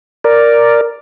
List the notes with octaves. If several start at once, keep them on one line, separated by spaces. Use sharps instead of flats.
A#4 D5